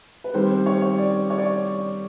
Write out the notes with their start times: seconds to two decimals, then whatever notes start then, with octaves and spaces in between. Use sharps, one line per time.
0.24 B4
0.34 D#3 G3 C4 C5
0.51 C5
0.66 C#5
0.82 C#5
0.98 D5
1.30 C#5
1.38 D5
1.46 C#5